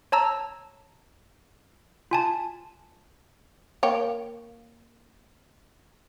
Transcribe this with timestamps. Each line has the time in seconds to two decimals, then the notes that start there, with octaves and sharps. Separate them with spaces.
0.12 C#5 A5 A#5 E6
2.11 F4 G#5 A5
3.83 A#3 C#5 G5